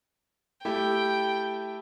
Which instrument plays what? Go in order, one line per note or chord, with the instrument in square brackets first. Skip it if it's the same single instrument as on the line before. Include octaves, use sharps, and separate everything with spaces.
[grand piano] A3 E4 G4 [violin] G5